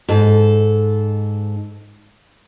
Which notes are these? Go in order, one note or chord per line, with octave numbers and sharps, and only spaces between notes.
G#2 A4